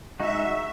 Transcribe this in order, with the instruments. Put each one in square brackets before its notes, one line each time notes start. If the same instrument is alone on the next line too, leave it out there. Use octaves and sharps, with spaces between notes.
[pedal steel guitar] G#3 D#4 F#4 [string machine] E5